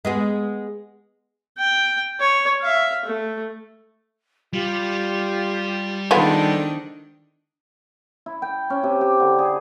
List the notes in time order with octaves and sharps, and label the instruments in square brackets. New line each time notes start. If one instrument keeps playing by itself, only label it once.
[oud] G#3 B3 G#4
[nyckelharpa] G5
C#5
E5 F5
A3
[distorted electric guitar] G3 [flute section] F4 G4
[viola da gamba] D#3 D4 [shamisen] G#3 B3 F4 [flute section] A4 C5 D5
[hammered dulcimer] E4
G5
C#4
C3
G4
D3
G#4